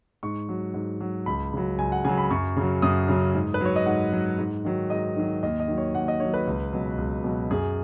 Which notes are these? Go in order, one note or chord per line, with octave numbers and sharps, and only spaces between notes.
G#2 C#6
F#3
G#2
F#3
C#2 B5
C#3 F#3
C#2 G#5
F#5
C#3 F#3 G#5
B5
F#2 C#6
C#3 F#3
F#2 D#6
C#3 F#3
G#2
B4
F#3 C#5
D#5
G#2 F#5
F#3
G#2
D#3 F#3
G#2 D#5
D#3 F#3
D#2 D#5
D#5
D#3 F#3
C#5
D#2 F#5
D#5
D#3 F#3 C#5
B4
C#2
B2 F#3
C#2
B2 F#3
F#2 G#4